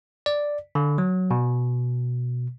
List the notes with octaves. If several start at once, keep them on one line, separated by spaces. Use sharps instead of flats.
D5
D3
F#3
B2